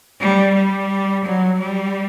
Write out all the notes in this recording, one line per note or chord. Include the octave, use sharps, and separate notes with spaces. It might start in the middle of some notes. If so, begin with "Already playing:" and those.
G3
G3
F#3
G3